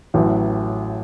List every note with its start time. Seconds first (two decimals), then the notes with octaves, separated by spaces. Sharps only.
0.14 A1 A2 F#3